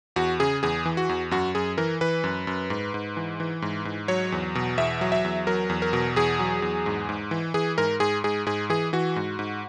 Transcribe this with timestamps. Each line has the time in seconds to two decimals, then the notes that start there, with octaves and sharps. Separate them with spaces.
0.16 E2 F#4
0.40 C#3 G#4
0.63 E2 G#4
0.86 E3
0.97 F#4
1.09 E2
1.31 F#2 F#4
1.55 F#2 G#4
1.78 E3 A#4
2.01 E3 B4
2.24 F#2
2.47 F#2
2.70 G#2
2.94 G#2
3.17 E3
3.40 E3
3.62 G#2
3.85 G#2
4.08 F#3 C#5
4.32 E2
4.55 B2
4.78 E2 E5
5.01 F#3
5.12 E5
5.25 E2
5.47 F#3 A#4
5.69 E2
5.82 A#4
5.93 B2
6.16 E2 G#4
6.39 F#3
6.62 E2
6.86 G#2
7.09 G#2
7.31 E3
7.54 E3 G#4
7.78 G#2 A#4
8.00 G#2 G#4
8.24 G#2 G#4
8.46 G#2 G#4
8.70 E3 G#4
8.93 E3 F#4
9.16 G#2
9.39 G#2